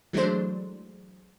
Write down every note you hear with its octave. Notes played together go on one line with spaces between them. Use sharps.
E3 F#3 G#3 A3 D4 C5